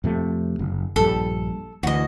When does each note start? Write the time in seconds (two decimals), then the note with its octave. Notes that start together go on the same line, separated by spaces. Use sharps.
0.04 F2 C3 A3
0.59 F#1
0.96 A#1 G2 G3 A4
1.83 D2 E3 F#4 D#5